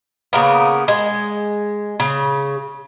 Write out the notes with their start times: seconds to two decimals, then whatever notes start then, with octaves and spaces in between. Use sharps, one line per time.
0.33 C#3 A#3 B3
0.88 G#3
2.00 C#3